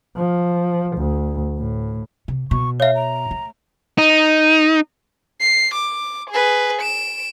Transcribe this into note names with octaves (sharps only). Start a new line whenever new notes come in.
F3
D2
A2
C3
B2 C#6
C#5 E5 F5
A#5
A3
D#4
C7
D6
G#4 B4
D7 E7